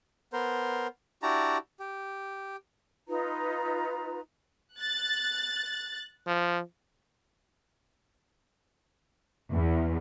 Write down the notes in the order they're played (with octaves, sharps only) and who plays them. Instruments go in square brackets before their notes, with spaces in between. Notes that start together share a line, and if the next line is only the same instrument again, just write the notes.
[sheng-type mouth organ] B3 A#4 C5
D4 E4 F#4 G4 A5 A#5
G4
[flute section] D#4 F4 B4 A#5
[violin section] F#6 A6
[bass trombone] F3
[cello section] E2